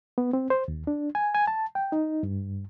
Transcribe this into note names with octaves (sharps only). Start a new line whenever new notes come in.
B3
C4
C5
D#2
D4
G#5
G#5
A5
G5
D#4
G2